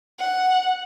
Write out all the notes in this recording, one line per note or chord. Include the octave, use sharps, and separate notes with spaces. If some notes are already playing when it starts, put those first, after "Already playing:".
F#5